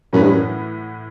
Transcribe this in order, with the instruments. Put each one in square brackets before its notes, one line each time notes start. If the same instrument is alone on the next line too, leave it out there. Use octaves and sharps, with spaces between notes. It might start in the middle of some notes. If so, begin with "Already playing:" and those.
[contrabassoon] F#2 [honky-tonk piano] A2 E3 B3
[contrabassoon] G2
F#2